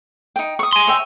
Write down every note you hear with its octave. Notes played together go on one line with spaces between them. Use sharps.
D#4 G5
C#6 D#6
G#5 C6
C#5 E5 G5